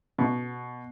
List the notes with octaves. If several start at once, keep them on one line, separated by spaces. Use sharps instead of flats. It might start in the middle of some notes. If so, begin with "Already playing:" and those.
B2